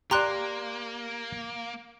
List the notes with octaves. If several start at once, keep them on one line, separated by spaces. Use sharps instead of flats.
A#3 G4 D5 A#5 C6 F#6